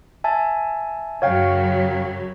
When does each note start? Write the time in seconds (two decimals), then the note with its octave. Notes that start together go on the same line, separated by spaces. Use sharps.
0.24 E5 G#5 A5
1.22 F#2 C#3 F#3 C#5 F5 G5